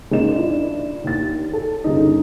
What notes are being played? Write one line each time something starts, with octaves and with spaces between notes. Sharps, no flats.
G#1 C#3 A#3 D#5 E7
D4 E4 F4
D#2 A6
A4
G1 D#2 C#3 D#4